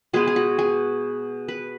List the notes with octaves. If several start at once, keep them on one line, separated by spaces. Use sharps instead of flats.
B2 G#3 B3 G#4
G#4
F#4
G#4
B4